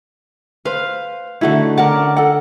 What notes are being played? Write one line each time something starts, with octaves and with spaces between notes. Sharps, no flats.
B4 C5 F5
D3 A3 D#4 E4 F#4
A#4 D5 F#5 A5
C#4
A4 F#5